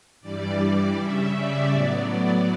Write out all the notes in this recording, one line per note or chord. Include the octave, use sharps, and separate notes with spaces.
G2 E3 G3 D5
C#3 G3 C#4 E5
D5
A2 F#3 B3